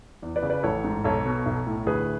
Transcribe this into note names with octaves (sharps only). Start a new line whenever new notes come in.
E2
B4 D5
C#3
B4 D5
A1 A4 C#5
G#2
B1 A4 C#5
B2
B1
A2
D2 G#4 B4